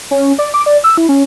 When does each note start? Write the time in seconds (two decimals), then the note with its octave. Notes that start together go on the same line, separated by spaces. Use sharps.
0.11 C#4
0.39 D5
0.54 D6
0.66 D5
0.84 E6
0.97 E4
1.09 C#4